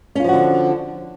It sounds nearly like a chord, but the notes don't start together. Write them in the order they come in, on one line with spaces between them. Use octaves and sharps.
C#4 F4 F3 F#4 D3